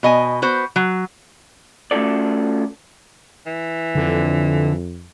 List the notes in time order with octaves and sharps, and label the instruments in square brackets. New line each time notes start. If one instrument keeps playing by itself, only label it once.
[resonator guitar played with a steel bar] B2 D#5 G#5
B3 F#4 C5
F#3
[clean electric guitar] A3 C#4 F4 F#4 A4 D5
[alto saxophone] E3
[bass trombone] F2 [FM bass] D3